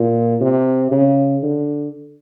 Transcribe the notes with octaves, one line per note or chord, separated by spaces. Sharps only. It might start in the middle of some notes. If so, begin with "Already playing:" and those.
Already playing: A#2
C3
C#3
D3